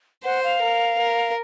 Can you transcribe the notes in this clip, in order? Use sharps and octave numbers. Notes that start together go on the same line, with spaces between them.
C5 F#5
F5
A#4
A#4